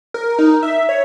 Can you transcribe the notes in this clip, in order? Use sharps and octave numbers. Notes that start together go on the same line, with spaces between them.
A#4
D#4
E5
C#5